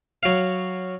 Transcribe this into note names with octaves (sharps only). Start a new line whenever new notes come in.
F#3 F5